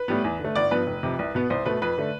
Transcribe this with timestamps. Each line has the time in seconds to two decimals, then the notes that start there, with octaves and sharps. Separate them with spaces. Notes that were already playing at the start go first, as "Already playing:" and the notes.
Already playing: B4
0.08 A2 G3 B3
0.24 E2
0.39 D3
0.44 A3
0.56 G1 D5
0.71 G2 F3 B3 B4
0.87 F1
1.03 F2 C3
1.19 C2
1.35 B2 B3
1.50 C2 C5
1.66 B2 A3 B4
1.82 F2 B4
1.98 D3 A3